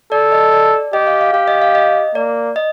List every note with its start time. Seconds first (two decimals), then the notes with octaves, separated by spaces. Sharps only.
0.12 A4 D5
0.32 D#5
0.53 D5
0.93 G4 D#5
1.07 F5
1.21 F5
1.33 G4 F5
1.48 D#5
1.62 F5
1.75 D#5
2.15 A#3 D5
2.56 D#5